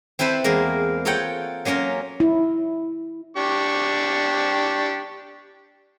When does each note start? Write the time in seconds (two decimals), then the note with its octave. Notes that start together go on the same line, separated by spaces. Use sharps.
0.19 C4 E4 A4 B4 C5
0.44 E2 G#3 A#3 A#4
1.05 F4 A4 A#4 C#5 F#5 G5
1.65 F#3 A#3 C#4 F4 A#4
2.20 E4
3.37 D4 G4 C#6